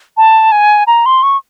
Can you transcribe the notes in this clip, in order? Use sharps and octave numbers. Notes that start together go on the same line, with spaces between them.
A5
G#5
A#5
C6
C#6